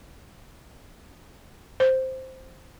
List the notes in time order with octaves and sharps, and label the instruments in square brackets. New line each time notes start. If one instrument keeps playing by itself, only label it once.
[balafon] C5